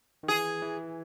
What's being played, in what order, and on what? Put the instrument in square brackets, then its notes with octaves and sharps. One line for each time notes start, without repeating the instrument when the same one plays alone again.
[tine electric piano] D#3
[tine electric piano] E3 [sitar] G#4
[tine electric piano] E3